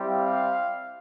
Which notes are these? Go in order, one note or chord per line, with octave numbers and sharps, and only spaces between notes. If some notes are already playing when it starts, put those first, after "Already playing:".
Already playing: G3 C4 E4 G4
F5